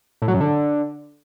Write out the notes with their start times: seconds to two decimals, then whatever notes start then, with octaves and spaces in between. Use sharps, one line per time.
0.22 A2
0.28 F#3
0.34 F#2
0.41 D3